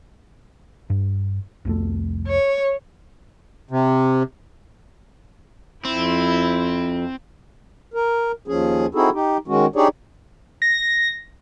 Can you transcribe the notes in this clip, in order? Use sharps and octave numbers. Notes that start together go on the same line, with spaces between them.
G2
C2 F2 A3
C#5
C3
F2 C4 E4
A#4
D#2 F3 C#4 G#4
C4 D#4 E4 F#4 G#4 A4
D#4 G4
D#3 G#3 C#4 F#4
D4 D#4 G4 G#4 C#5 D5
A#6